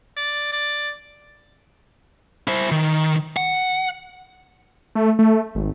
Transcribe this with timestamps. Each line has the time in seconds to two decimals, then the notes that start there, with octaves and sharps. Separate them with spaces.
0.17 D5
0.52 D5
2.48 E4 C5
2.71 D#3
3.37 F#5
4.95 A3
5.19 A3
5.55 G#1